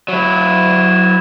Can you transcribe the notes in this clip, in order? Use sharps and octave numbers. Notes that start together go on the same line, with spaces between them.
F#3 E4